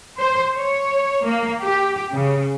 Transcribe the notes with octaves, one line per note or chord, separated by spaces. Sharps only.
C5
C#5
A#3
G4
C#3